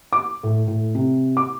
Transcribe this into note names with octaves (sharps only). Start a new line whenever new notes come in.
D6
A2
A2
C3
D6